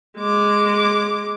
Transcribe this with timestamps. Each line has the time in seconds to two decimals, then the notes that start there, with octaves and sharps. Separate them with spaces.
0.18 G#3 D6